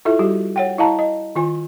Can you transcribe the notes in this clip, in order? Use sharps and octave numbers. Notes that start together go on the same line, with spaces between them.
E4 F4 A4 E5
G3 F#4 G4
C#5 F#5 G5
E4 D#5 F5 A5 A#5
D#5
D#3 F4 G#5